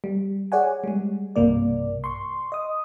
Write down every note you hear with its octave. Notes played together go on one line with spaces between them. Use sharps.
G3
G#4 C#5 D5 F#5 G#5
G3 G#3
B1 G2 C3 A#3 D5
C6 C#6
D#5 D#6